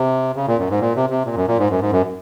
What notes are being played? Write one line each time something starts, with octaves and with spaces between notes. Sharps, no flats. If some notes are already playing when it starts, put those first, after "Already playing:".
Already playing: C3
C#3
A#2
F#2
G#2
A#2
C3
C3
A#2
F#2
A#2
G#2
F#2
G#2
F#2